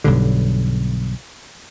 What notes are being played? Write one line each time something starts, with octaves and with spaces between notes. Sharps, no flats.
B1 G2 D3